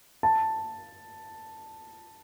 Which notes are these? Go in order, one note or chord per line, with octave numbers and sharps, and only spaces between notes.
A5